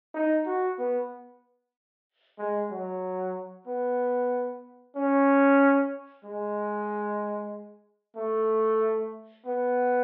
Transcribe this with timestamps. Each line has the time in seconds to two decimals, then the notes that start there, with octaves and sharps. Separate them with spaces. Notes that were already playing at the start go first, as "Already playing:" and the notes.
0.14 D#4
0.46 F#4
0.78 B3
2.39 G#3
2.71 F#3
3.67 B3
4.96 C#4
6.24 G#3
8.16 A3
9.46 B3